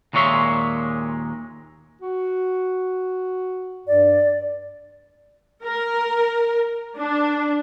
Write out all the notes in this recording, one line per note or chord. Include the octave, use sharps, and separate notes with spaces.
D#2 A#2 G#3 C#5 E5 C6
F#4
G2 D5
A#4
D4